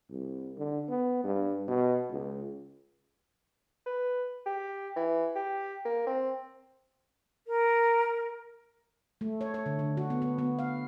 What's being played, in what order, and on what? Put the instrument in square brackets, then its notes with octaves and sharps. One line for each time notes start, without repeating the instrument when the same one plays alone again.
[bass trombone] C2
D3
B3
G2
B2
C#2
[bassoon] B4
G4
E3
G4
A#3
C4
[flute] A#4
[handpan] A3
C#5
C#5
D3
D3
F#4
B3
B3
B3
F5